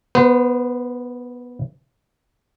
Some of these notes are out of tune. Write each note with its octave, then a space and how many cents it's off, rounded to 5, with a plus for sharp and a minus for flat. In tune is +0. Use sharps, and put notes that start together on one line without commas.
B3 -10 C5 -40